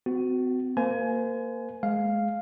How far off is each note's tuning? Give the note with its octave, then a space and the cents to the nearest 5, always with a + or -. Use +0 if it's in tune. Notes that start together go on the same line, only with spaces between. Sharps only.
C4 -45 F#4 +0
A#3 -10 C5 -30 G#5 +25
G#3 +20 F5 +0